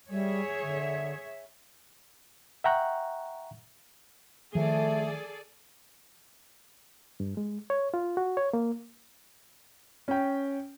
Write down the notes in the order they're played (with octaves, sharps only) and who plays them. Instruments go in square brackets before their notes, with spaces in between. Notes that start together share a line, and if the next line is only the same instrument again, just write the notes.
[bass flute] G3 [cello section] G#4 C#5 E5
[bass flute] D3
[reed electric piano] E5 F#5 G5 A#5 C#6 F#6
[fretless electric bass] D#3 F3 [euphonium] A3 [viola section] G#4 A4 D5
[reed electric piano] G2
G#3
C#5
F4
F#4
C#5
A#3
[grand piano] C#4 G5